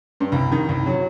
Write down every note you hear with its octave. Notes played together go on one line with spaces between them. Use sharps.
G2
C2
D#3
C2
F#3